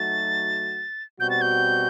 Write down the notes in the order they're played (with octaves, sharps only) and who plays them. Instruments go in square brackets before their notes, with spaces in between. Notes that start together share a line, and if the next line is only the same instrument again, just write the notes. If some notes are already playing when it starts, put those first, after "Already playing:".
Already playing: [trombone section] F#3 A3 D#4 F#4 [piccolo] A6
[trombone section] B2 G3 C4 F#4 [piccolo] G6
[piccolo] A6
G6